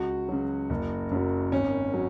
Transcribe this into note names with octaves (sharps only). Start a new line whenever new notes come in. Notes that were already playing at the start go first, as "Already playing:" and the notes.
Already playing: C#2 F#4
C#3 F#3
F#1
F#2 F#3
G#1 C#4
F#3